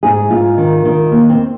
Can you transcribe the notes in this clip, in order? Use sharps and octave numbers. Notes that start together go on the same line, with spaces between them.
G#2 G#4
G#2 F4
D#3
D#3
D#2
C4